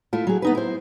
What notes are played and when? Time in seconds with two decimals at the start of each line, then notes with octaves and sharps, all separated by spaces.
0.13 A3 E4 F4
0.27 F#3 G#4
0.42 B3 D#4 B4
0.55 E4 C5